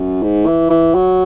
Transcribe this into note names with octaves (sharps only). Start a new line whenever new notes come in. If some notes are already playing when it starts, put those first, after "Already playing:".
Already playing: F#2
G#2
E3
E3
F#3